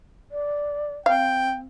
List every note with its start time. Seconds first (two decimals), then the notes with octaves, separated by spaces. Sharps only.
0.31 D5
1.06 C4 F5 G5